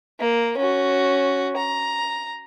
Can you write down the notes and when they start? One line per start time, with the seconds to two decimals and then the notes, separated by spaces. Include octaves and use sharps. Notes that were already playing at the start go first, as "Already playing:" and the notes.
0.20 A#3
0.58 C#4 F#4
1.57 A#5